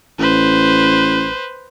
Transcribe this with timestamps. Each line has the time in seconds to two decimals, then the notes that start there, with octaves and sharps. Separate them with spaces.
0.19 A1 B4 C5